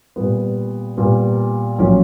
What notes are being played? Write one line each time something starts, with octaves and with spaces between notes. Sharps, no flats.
A#2 G3 B3
A#2 G3 B3
A#1 A#2 F#3 C#4